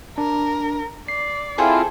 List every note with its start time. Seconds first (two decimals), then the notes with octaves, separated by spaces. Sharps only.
0.18 D4 A#4
1.08 D5 C7
1.58 C4 E4 F4 G#4 A4 C5